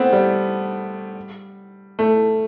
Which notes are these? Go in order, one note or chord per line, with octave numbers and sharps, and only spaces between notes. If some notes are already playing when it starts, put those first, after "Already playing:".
Already playing: A3 B3 C4
G3
A3